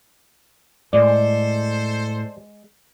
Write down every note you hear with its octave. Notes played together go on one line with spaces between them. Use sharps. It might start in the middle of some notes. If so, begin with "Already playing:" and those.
A2 G#3 A4 C5 D5